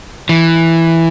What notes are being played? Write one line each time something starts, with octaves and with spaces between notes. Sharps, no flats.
E3